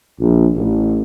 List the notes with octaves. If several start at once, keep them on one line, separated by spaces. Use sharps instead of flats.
A#1
A1